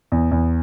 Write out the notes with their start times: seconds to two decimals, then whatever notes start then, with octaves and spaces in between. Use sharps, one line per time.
0.12 E2
0.31 E2